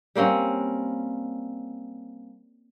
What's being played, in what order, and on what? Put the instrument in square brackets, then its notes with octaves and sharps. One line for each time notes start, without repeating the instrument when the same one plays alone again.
[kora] G3 A#3 C4 C#4